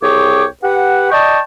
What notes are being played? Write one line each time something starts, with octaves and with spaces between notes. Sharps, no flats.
C2 G#4 C#5 G5 D6
G4 B4 F#5
D5 D#5 G5 A5 C#6